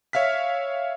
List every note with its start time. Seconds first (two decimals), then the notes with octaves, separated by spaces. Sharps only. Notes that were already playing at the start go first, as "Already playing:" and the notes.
0.13 C#5 E5 F5 F6 B6